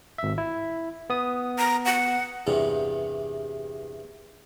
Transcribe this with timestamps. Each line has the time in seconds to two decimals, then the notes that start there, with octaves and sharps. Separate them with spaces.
0.18 G#1 E5
0.38 E4
1.10 B3 D#6
1.58 A#5
1.85 F#5
2.47 E2 G2 C3 E3